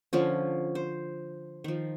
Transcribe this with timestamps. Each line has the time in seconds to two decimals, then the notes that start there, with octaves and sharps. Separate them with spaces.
0.13 D3 F3 C#4
0.75 C5
1.64 D#3 F3